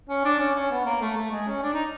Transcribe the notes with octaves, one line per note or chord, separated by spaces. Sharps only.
C#4
D4
C#4
C#4
B3
A#3
A3
A3
G#3
C#4
D4
D#4